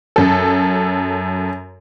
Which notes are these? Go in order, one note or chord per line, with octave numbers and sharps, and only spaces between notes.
F#2 A4